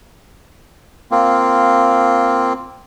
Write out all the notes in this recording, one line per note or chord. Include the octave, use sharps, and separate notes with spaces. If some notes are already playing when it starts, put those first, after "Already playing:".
A#3 C4 F4